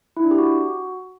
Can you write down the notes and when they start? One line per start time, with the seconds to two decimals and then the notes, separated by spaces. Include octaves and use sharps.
0.17 E4
0.24 D4
0.31 G4
0.38 F#4